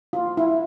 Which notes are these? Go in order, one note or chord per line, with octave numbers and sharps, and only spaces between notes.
F4
E4